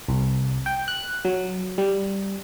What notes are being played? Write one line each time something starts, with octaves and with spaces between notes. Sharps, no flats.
C2
G5
F#6
F#3
G3